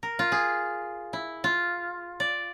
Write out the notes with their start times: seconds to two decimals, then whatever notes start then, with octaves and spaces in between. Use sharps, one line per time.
0.03 A#4
0.19 F4
0.32 G#4
1.13 E4
1.44 F4
2.20 D5